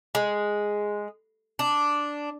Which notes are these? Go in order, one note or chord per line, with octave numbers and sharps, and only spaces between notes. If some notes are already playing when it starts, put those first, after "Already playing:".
G#3
D4